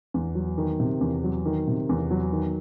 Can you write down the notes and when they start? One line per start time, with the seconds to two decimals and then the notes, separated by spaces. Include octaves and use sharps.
0.14 E2
0.35 F#3
0.58 D#3
0.80 C3
1.01 E2
1.24 F#3
1.46 D#3
1.67 C3
1.89 E2
2.11 F#3
2.32 D#3